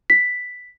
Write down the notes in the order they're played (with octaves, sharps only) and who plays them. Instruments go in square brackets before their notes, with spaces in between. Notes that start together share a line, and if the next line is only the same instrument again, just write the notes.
[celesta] B6